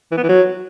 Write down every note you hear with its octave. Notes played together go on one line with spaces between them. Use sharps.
E3
B3
E3
F#3